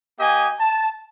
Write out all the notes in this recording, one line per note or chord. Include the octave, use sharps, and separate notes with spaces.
A#3 G4 D#5 G#5
A5